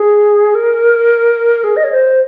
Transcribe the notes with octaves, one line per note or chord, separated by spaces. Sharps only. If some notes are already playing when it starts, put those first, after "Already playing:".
Already playing: G#4
A#4
G#4
D#5
C#5
C5